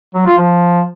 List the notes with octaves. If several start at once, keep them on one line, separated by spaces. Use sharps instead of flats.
F#3
F4
F3